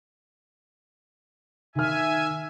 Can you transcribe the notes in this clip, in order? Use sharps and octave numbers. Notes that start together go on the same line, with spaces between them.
D#3 E5 G#5 F6